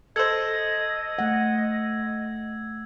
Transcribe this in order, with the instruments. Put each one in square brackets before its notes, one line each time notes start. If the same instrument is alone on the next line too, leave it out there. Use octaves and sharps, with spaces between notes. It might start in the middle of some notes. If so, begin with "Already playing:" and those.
[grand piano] A4 C5 [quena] D#5 [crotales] E6 G#6
[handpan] A3 F#5